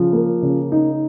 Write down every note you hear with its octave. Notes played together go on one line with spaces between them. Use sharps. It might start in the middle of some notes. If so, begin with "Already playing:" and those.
Already playing: C#3 F3
A#3
C#3
D#4